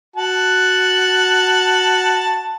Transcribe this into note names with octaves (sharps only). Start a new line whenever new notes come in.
F#4 A5